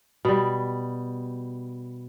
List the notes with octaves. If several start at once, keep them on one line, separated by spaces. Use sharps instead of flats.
B2 G3